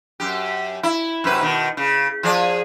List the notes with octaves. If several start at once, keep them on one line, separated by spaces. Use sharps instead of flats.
F#2 G4
E4
F#2 C3 B4
B2 D#3
C#3
F3 G#4 D5